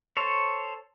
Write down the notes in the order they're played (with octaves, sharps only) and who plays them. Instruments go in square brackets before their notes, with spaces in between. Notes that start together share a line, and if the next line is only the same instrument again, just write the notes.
[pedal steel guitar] A4 C5 C#5